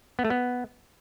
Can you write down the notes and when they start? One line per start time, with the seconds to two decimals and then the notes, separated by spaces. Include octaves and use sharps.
0.19 B3
0.25 A3
0.30 B3